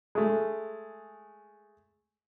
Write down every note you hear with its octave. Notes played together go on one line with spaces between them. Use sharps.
G#3 A3